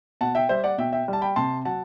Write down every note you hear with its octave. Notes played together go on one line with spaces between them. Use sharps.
B2 F#5 A5
E5 G5
G3 C5 E5
D5 F#5
B2 E5 G5
E5 G5
G3 A5
G5 B5
C3 A5 C6
F#3 F#5 A5